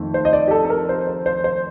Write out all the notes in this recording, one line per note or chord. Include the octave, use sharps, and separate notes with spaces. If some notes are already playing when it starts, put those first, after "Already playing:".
Already playing: F2 D#3 A3 C4
C5
D#5
D5
G4
A4
A4
A#4
C5
C5
C5
C5